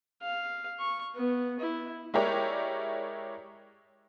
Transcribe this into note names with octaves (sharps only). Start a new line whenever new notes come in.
F5
C#6
B3
E4
G#3 E4 G4 A#4 C#5 D5